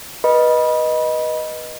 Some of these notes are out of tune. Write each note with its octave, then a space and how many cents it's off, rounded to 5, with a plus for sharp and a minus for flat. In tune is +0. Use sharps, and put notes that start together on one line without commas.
B4 -20 D#5 +0 B5 -25